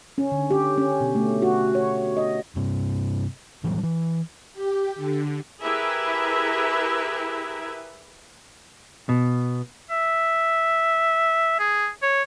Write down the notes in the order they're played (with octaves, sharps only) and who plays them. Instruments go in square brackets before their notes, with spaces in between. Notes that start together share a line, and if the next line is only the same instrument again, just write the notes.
[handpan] C#4
D3
G4
C#4
B2
A3
F#4
C#5
D#5
[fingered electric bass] G2 C3
A2 E3 F#3 G3
E3
[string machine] G4
D3
[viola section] E4 G4 G#4 A#4 B4 E5
[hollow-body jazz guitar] B2
[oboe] E5
G#4
C#5